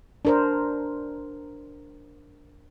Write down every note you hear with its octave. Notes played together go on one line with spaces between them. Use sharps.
D4 A#4 C5